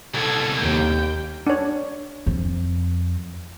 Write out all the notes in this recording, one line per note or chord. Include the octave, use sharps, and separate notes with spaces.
C2 B2 A4 G#6
D#2 A#3 G5
D4 C#5
F2